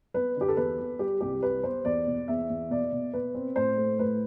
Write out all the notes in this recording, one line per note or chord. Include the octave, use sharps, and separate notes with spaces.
B3 B4
D3 G4
A4
E2 B4
B3
G3 G4
C2 G4
G3 B4
B3 C5
E2 D5
B2
E2 E5
E2
B2 D5
B2
B2 B4
C4
A2 C5
A3
A2 B4